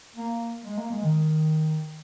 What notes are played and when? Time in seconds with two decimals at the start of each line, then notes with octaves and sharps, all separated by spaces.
0.16 A#3
0.65 G#3
0.77 A#3
0.91 G#3
1.03 D#3